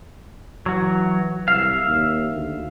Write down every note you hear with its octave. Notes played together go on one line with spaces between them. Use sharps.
E3 F#3 F#4
C2 E5 F5
D#2
D2